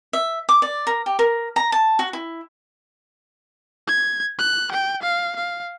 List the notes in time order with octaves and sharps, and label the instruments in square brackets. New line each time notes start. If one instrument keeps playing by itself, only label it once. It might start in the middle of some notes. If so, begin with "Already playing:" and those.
[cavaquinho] E5
D6
D5
A#4
G4
A#4
A#5
A5
F#4
E4
[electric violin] G#6
F#6
G5
F5
F5